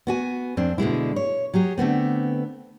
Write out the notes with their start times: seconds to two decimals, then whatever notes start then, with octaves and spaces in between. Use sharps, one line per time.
0.07 B3 F#4 G#5
0.57 F2 C4 D4
0.78 B2 D3 G#3 E4
1.16 C#5
1.54 F#3 G4 G#4
1.78 D3 A3 B3 C4